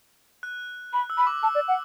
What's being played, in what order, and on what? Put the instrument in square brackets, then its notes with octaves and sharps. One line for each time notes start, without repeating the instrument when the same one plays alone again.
[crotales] F#6
[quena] B5
[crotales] E6
[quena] B5
[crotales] D6
[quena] A5 [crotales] E6
[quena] D5
F#5